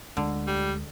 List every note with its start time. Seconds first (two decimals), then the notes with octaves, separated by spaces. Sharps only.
0.17 D2 D3 G#3
0.47 G3